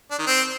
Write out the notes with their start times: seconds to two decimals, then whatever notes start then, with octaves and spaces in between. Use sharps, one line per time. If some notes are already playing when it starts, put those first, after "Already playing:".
0.11 D4
0.19 D#3
0.27 C4